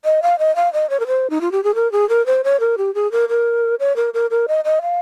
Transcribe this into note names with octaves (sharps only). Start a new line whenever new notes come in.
D#5
F5
D#5
F5
D#5
C#5
A#4
C5
D#4
F4
G4
G#4
A#4
G#4
A#4
C5
C#5
A#4
G4
G#4
A#4
A#4
C#5
A#4
A#4
A#4
D#5
D#5
F5